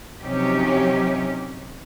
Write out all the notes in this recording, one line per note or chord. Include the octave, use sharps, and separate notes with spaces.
C3 F3 F#3 C#4 D#4 G4